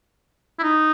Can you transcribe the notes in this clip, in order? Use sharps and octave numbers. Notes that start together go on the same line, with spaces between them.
E4
D#4